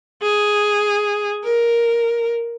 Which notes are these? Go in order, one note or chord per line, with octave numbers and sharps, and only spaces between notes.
G#4
A#4